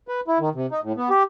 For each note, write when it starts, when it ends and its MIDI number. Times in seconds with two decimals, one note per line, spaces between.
0.08 0.21 71
0.28 0.38 64
0.39 0.49 51
0.55 0.66 48
0.71 0.80 63
0.84 0.93 45
0.97 1.09 59
1.10 1.23 67